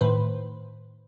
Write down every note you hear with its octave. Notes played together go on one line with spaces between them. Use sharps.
A2 D#3 B4 C5